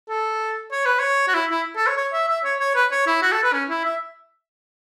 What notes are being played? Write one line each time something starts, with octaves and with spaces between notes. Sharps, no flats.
A4
C#5
B4
C#5
F#4
E4
E4
A4
C#5
C#5
E5
E5
C#5
C#5
B4
C#5
E4
F#4
A4
B4
C#4
E4
E5